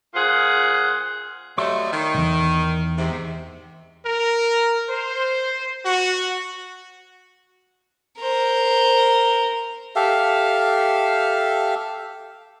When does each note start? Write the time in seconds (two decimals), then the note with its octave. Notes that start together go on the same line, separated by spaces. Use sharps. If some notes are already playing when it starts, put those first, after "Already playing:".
0.14 A#2 F4 G#4 C5 F#5
1.58 F#3 G3 A3 D#5 C6
1.92 D#3
2.15 B1 E2
2.98 G#2 C3
4.06 A#4
4.89 C5
5.86 F#4
8.18 A#4 C5
9.96 G4 A4 E5 F5